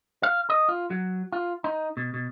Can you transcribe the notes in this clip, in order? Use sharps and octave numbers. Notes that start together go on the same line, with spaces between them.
F5
D#5
F4
F#3
F4
D#4
B2
B2